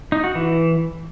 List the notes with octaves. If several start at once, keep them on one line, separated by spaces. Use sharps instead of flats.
D#4
F#4
E3